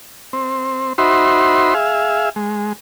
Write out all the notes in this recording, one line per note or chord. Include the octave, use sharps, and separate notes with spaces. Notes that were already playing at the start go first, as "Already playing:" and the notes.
C4
D#4 F#4 C5 E5 B5 C6
G#4 E5 F5
G#3